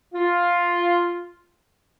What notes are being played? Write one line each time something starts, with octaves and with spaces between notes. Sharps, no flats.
F4